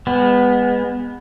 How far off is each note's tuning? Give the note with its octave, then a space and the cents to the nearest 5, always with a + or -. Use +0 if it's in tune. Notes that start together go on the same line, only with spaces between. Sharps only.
G#3 -30 B3 +0